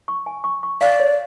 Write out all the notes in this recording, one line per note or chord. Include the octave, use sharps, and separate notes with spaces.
C#6
G#5
C#6
C#6
D5 F5
C#5